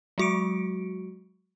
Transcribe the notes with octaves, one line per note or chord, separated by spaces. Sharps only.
F#3 G#3 F#4 C#6 C#7 D7